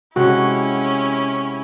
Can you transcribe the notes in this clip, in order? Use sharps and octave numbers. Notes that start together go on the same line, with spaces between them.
C3 G#3 C#4 E4 F#4 F#5